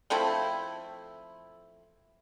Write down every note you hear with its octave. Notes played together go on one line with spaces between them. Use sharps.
F3 A3 C4 E4